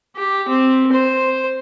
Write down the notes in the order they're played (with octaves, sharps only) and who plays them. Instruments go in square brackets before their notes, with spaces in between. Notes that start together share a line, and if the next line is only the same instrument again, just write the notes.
[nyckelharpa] G4
C4
C5